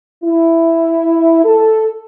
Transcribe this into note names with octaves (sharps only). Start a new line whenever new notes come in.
E4
A4